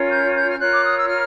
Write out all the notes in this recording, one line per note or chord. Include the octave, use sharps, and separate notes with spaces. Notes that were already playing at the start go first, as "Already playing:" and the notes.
Already playing: C#4 F4 A#4 C#5
G6
G6
F6
F4 A#4 C#5 F#6
D6
D#6
E6
F6